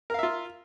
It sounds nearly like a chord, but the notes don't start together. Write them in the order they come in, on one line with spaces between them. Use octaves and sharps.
A#4 F5 E5 F4